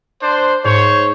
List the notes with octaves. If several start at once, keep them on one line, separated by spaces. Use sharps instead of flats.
D4 C5
G#2 C5 C#5